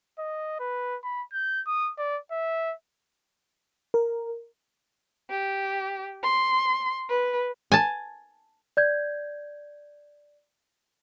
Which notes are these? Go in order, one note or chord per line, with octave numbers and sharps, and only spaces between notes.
D#5
B4
B5
G6
D#6
D5
E5
A#4
G4
C6
B4
G#5 A5
D5 G6 G#6